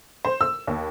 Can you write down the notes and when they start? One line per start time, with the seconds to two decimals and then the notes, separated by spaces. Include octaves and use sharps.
0.25 C5
0.41 E6
0.67 D#2